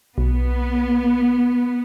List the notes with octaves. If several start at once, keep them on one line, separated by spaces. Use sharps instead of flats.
B1 B3